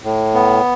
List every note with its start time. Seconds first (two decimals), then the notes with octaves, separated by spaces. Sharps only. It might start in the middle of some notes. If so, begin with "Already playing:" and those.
0.04 A2
0.34 B3